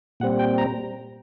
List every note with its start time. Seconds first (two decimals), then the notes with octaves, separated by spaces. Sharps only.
0.20 A#2 G3 C4 F#5
0.39 G5
0.58 A#5